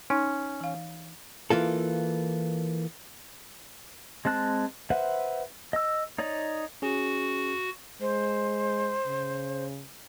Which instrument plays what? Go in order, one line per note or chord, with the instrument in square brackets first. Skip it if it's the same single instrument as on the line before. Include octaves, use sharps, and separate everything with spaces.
[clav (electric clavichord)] C#4 [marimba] D#4
[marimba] E3 F5
[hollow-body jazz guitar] E3 A#3 F4 A4
[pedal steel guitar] G#3 C4 A5 F#6
B4 C5 E5 F#5
D#5 E6
D#4 C#5 D5
[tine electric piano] C#4 G#4 [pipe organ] F#4
[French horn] G#3 [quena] C5
[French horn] C#3